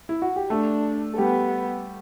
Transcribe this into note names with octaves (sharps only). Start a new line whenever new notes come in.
E4
F#4
G4
A3 D4 A4
A4
G3 B3 G4